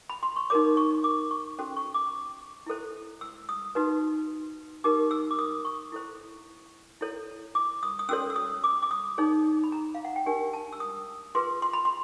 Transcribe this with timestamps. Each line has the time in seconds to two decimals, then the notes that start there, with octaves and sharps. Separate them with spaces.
0.10 B5
0.23 C6
0.36 C#6
0.50 D#4 F#4 A#4 C#5 D6
0.77 C#6
1.04 D6
1.31 C#6
1.59 C#4 F#4 A4 C5
1.77 C#6
1.94 D6
2.66 E4 A4 C5
3.21 E6
3.49 D#6
3.75 D#4 F#4 B4
4.84 D#4 G4 A#4 D6
5.11 E6
5.31 D6
5.39 D#6
5.65 C#6
5.92 E4 A4 C5
7.01 E4 A4 C#5
7.55 D6
7.83 D#6
7.99 D#6
8.09 C#4 F#4 A4 C#5 E6
8.30 E6
8.36 D#6
8.64 D6
8.82 D6
8.91 D#6
9.18 D#4 G#4 C#5
9.64 B5
9.72 A#5
9.95 F5
10.05 F#5
10.16 G5
10.26 D4 G4 A#4 G#5
10.53 A5
10.73 E6
10.80 D#6
11.35 F4 G#4 B4 C6
11.62 C6
11.73 B5
11.85 C6